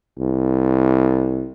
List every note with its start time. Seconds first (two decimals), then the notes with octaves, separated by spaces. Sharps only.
0.19 C2